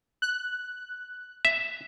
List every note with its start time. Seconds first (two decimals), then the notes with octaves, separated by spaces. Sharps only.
0.22 F#6
1.45 E5